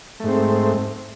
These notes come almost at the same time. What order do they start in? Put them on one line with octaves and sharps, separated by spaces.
A3 G#2 C4